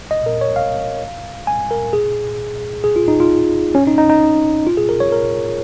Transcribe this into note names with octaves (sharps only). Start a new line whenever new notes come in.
D#5
A#4
C#5
F5
G#5
A#4
G#4
G#4
F4
D#4
F4
C#4
D#4
D#4
D#4
F4
G#4
A#4
C#5
A#4